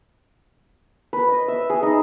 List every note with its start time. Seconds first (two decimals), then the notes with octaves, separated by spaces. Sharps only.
1.13 B4
1.28 D#5
1.48 E5
1.70 G#4
1.83 D#4